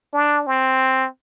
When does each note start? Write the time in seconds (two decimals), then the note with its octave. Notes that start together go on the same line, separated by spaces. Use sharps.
0.13 D4
0.47 C4